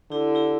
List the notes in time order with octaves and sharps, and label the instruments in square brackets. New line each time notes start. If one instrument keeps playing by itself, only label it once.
[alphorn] D3 [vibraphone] E4 G4
[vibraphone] E4 G4